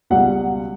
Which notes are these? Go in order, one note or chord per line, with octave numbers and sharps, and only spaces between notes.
C#2 B2 G3 F#5